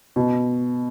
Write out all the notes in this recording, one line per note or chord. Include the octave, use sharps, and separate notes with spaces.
B2